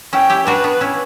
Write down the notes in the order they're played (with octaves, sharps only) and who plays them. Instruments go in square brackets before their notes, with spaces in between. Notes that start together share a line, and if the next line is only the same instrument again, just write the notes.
[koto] C#4 E4 [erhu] G5
[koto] E4 G4
[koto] D4 F#4 [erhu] B4
[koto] B3 D4
C#4 E4